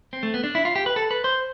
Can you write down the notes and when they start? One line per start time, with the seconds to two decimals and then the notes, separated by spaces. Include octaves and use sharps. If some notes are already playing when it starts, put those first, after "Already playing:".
0.13 C4
0.23 A3
0.34 B3
0.44 D4
0.55 E4
0.65 F4
0.76 G4
0.86 B4
0.96 A4
1.11 B4
1.24 C5